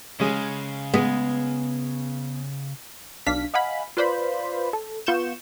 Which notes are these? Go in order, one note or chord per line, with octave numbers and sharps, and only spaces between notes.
C#3 G#3 C#4
G#3 B3
B1 D4 F5 B6
D#5 F5 F#5 G#5 B5
F4 B4 C5 D5 B5
A4
B3 F4 C#6 G6 E7